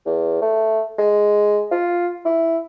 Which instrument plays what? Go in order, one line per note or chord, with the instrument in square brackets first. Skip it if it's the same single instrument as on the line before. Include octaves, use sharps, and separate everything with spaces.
[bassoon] E2
A3
G#3
F4
E4